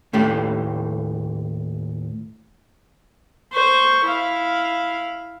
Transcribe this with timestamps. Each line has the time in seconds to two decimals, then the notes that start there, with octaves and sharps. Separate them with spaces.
0.13 D#2 A2 A3 G4
3.53 C5 C#6
4.05 E4 F5